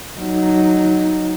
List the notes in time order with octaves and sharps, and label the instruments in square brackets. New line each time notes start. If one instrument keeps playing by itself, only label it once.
[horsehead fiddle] F#3 D#4